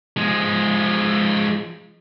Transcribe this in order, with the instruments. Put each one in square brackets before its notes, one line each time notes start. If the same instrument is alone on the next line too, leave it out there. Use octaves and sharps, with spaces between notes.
[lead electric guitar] F3 G#3